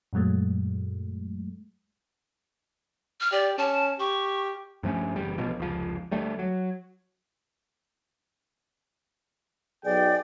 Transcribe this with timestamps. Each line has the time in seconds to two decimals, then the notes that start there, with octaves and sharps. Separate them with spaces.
0.13 F#2 A#2 F#3 G#3 A3
3.20 F6
3.32 G4 D5
3.58 C#4 A5
4.00 G4 C#6
4.83 G2 F3 A3 C#4
5.16 F#1 E2 G3
5.38 A1 B2 F3
5.58 F1 C#2 F3
6.12 D2 G3 A3
6.39 F#3
9.85 B1 G#4 D5 G5